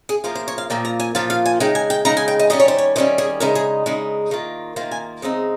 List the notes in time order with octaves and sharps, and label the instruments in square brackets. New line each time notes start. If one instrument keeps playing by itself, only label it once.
[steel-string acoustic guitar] G#4
F3 A#3 F4 C5
C5
C#5
F5
A#2 F3 A#3 F4 G5
A#5
G#5
A#2 F3 A#3 F4 F5
F5
G#5
C#3 G#3 D#4 G5
G#5
G5
C#3 G#3 D#4 A#5
G#5
G5
D#5
D#3 G3 C#4 D#5
C#5
C5
C#5
D#3 G3 C#4 C5
G#4
C#3 G#3 D#4 A#4
G#4
C#3 G#3 D#4
D#3 A#3 F4
D#3 A#3 F4 C5
G#5
C#3 G#3 C4 D#4